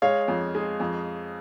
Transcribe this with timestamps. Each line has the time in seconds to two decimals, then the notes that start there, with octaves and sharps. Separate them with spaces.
0.02 G#3 C#5 F5
0.28 F2
0.55 G#3
0.80 F2